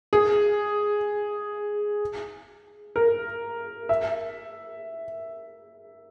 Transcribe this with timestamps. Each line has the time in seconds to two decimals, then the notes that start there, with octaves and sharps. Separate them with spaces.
0.13 G#4
2.96 A#4
3.89 E5